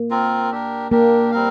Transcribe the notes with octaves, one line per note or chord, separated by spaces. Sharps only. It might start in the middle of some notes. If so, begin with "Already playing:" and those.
Already playing: A#3
C4 F4 A#4
D4 G4 A#4
A#3 D4 G4 A#4
G3 C4 A#4 F5